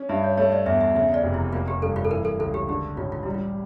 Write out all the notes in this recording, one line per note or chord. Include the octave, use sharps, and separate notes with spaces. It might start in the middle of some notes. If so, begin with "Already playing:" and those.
Already playing: C#4
G2 E5
C#5
A3 C#5
D5
E2 E5
E5
C#3 E5
D5
F1
E4
A#3 F4
G4
G2 A4
F4
A4
E3 A#4
A4
C#2 A4
G4
D3 G4
A1 F4
F4
G3 E4
F4